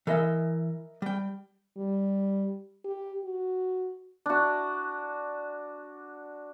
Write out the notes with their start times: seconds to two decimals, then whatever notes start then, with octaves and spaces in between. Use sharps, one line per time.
0.07 E3 A#4 D#5 E5
1.02 G3 G5
1.77 G3
2.85 G4
3.25 F#4
4.26 D4 F#4